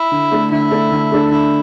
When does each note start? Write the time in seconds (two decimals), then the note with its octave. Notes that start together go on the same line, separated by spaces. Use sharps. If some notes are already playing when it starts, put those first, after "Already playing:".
Already playing: E4
0.11 D3
0.32 A3 D4 A4
0.52 D3 E4
0.71 A3 D4 A4
0.92 D3
1.12 A3 D4 A4
1.31 D3 E4